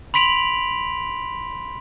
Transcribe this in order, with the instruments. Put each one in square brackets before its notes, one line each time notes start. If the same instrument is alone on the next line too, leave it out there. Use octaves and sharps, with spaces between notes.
[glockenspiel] B5 C6 B6 D7 F7 F#7